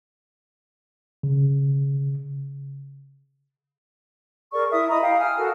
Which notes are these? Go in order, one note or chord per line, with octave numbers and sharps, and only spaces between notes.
C#3
G#4 A#4 D5 C#6
E4 E5 D#6
D#5 A#5 B5 D#6
G4 F5
G#5 D#6 F6
F#4 A4 A#4